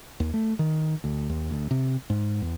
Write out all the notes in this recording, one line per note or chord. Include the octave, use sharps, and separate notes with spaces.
D#2
A3
D#3
D2
D#2
D2
C3
G#2
E2